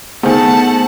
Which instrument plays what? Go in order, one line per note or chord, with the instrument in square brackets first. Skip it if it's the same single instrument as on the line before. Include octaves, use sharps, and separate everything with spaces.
[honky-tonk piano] D#3 A3 [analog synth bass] B3 [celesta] G#4 C5 G#5 [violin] F#5 A5